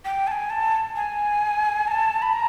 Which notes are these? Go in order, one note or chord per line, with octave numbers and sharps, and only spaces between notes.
G5
A5
G#5
A5
G#5
A#5
A5
B5
A#5